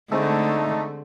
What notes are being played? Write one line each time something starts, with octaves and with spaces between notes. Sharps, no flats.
D3 G#3 A3 C4 D#4 G#4